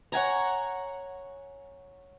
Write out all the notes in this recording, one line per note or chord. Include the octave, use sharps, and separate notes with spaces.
C#5 F#5 G#5 A#5